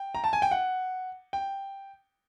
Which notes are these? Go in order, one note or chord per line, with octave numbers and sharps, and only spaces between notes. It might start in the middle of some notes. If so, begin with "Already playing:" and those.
Already playing: G5
A#5
A5
G#5
G5
F#5
G5